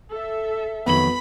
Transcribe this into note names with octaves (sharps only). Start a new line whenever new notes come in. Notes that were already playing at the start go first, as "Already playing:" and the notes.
A4 E5
F2 D#3 F#3 B3 B5 F#7